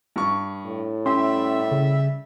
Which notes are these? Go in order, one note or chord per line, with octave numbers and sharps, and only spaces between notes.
G2 C#6
A2
G3 C#4 G4 E5 C6
C#3